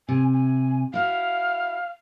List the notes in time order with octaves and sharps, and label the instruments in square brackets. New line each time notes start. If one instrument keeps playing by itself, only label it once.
[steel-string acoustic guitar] C3 [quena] G#5
[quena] G#5
[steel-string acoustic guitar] E4 F#4 [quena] F5